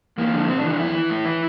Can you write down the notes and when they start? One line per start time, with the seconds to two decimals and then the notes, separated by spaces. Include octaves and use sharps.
0.18 E2 A#3
0.33 D3 F3
0.48 A2 C4
0.59 D4
0.64 E3
0.69 D4
0.79 F2 E4
0.95 E3
1.10 A2
1.25 E3